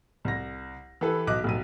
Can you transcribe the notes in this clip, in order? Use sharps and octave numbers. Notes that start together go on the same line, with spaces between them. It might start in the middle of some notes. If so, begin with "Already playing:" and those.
C2 A#6
E3 G4 A4 B4
B1 D#5 D6 F#6
F1 B1 D#7